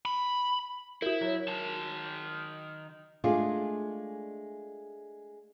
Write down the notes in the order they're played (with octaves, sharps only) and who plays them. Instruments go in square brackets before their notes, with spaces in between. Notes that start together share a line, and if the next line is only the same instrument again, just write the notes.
[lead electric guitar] B5
[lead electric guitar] E4 [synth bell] F#4 A#4
[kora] F#3
[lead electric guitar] D#3 A5
[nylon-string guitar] G#3 A3 D4 F4 G#4